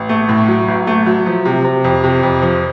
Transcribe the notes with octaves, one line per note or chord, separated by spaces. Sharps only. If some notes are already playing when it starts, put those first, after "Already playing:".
Already playing: A1
A3
A2
F#3
A1
A3
F#3
F3
C3
C3
F2
C3
F2
F3